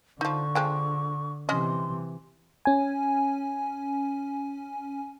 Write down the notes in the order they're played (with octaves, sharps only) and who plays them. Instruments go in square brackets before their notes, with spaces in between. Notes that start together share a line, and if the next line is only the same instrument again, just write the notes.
[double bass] D3 [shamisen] F3 D#4 [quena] C#6
[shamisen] F3 G#3 G5
[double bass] C3 E3 [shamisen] C#4 D#5 [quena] C6
[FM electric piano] C#4 G#5